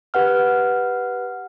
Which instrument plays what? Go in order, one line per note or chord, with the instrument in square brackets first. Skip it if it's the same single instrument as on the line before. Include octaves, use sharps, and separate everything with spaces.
[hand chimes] G4 B4 F#5 F6